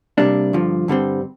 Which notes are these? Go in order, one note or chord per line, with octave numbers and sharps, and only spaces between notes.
C3 G3 A#3 D4
G2 D3 F3
G2 D3 G3 C4